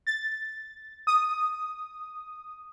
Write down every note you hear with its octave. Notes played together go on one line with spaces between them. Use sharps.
A6
D#6